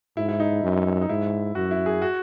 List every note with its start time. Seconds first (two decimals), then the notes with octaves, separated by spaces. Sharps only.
0.17 G#2 E4
0.29 E4
0.40 D#4
0.63 F#2
1.02 D#4
1.09 G#2 E4
1.55 F#2 F#4
1.71 E4
1.86 G#4
2.02 F#4